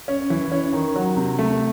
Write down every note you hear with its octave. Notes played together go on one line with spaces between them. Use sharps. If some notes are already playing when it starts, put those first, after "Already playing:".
C#4
E3
C#4
D#3
F#3
C3
A3